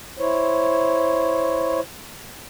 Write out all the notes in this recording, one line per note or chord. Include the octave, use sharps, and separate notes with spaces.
E4 C5 C#5